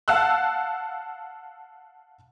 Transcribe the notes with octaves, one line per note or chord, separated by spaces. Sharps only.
F5 F#5 A5 E6 F#6